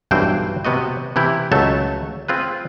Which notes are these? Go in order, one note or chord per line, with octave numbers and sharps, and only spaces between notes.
B1 G2 E3 C4 C5 G5
C3 B3 F#4 D#5
C3 E3 E4 G4
C#2 F#3 A3 A4 E5 A5
C4 F4 G#4 B4